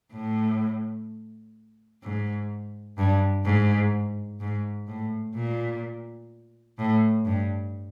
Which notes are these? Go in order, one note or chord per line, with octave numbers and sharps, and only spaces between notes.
A2
G#2
G2
G#2
G#2
A2
A#2
A2
G2